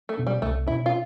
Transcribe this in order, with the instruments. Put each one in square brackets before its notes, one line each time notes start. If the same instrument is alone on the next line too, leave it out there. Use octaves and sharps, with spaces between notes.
[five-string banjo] A3
[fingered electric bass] B2 B3 D4
[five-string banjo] G3
[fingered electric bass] C2 [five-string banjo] A3
[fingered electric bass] B2 B3 D4 [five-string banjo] E4
[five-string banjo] F4